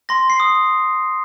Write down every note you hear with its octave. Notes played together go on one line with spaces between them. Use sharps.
C6 A#6
C7
D#6